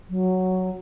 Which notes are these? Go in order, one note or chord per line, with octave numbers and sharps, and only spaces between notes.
F#3